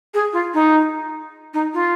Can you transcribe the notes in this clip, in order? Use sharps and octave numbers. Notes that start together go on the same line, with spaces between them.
G#4
F4
D#4
D#4
F4